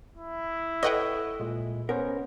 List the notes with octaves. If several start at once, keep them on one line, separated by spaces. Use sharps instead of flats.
E4
A4 B4 C#5 D#5 F#5 G5
A#2 G#3
B3 C#4 A#4 C5